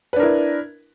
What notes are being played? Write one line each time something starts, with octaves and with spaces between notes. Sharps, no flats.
D4 E4 A#4 B4